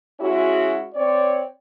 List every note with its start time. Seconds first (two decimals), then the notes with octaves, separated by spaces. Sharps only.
0.19 G#3 C#4 E4 F#4
0.94 C4 C#5 D5